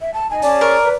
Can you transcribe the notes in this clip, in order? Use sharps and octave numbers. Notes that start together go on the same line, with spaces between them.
E5
A5
D#4 G#5
C#4 G#4 D5 A5
A#4 C#6
B4